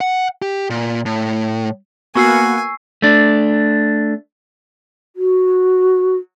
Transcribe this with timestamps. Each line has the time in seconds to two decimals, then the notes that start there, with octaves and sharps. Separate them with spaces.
0.01 F#5
0.42 G4
0.70 A#2
1.06 A2
2.15 A#3 B3 F#4 G#5 C#6 E6 C7
3.02 A3 D4
5.16 F#4